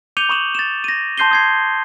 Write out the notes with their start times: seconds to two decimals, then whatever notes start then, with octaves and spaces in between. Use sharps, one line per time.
0.17 D6 G6 C#7 D#7 F7 G7
0.29 B5 C#6 D#6 E7 F#7
0.55 A6 E7
0.84 A#6 D#7
1.18 A5 C6 G6 C7 D#7 G7
1.31 D#6 G#6 C7